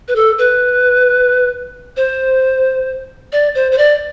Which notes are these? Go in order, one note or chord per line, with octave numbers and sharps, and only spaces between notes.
B4
A4
B4
C5
D5
C5
C5
D5